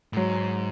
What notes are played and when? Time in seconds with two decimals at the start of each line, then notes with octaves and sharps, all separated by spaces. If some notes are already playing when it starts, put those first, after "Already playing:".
0.13 A2
0.17 G#2 F#3